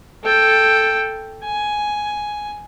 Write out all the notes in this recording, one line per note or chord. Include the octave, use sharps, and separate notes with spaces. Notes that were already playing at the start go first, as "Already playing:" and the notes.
A4 G5
G#5